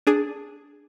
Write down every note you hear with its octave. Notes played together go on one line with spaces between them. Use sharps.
D4 G#4